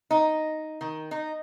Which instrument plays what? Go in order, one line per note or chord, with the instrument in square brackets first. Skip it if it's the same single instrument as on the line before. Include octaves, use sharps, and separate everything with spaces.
[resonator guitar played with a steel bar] D#4
D#3
D#4